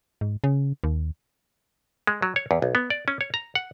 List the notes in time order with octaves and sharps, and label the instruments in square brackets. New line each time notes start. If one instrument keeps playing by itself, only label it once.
[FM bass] G#2
C#3
D#2
[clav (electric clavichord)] G#3
F#3
C#5
E2
B1
B3
D5
C#4
C#5
A#5
F#5